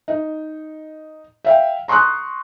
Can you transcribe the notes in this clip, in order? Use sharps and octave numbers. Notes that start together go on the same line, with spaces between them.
D#4
E5 F5 G5
A#5 C6 C#6 D#6 F#6